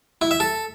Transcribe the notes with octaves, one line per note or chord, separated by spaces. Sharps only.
E4
E5
A4